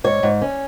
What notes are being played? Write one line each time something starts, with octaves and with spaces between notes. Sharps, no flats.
G#2 C#5
G#2
C#4